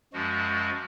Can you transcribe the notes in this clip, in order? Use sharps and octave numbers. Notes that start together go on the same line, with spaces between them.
F#2 F3 G#3 F#4